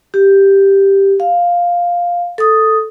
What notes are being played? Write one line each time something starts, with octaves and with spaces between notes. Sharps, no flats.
G4
F5
A4 D#6